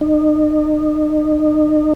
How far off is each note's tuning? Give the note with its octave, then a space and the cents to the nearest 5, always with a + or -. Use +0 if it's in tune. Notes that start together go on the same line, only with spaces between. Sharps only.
D#4 -35